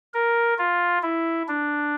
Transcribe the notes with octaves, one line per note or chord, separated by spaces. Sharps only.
A#4
F4
E4
D4